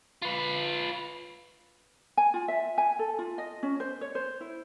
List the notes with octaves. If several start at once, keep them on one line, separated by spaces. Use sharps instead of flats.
F4 B4
G#5
F4
E5
G#5
A4
F4
D#5
C#4
C5
C#5
C5
E4